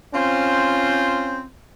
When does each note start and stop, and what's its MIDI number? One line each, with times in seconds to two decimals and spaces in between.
0.14 1.45 60
0.14 1.45 61
0.14 1.45 65
0.14 1.45 72